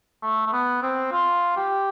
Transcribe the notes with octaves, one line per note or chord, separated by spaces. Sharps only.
A3
A3
B3
C4
F4
G4